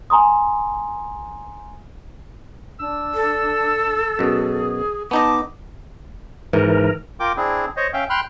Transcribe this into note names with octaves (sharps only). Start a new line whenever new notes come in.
G#5 A#5 C6 D#6
D4 E6
A4
F#2 B2 G#4
B3 D#4 D#5 A5 D6
G#2 E3 A#4
F4 A#4 G5 D6
C4 D4 E4 G#4
C5 C#5 D#5
C#4 E5 F5 G5
G5 B5 C6 F6 F#6